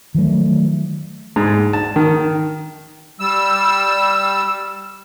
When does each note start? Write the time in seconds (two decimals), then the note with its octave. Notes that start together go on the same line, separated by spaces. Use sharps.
0.15 D#3 F3 F#3 A3
1.36 G#2
1.73 A5
1.96 D#3
3.20 G3 E6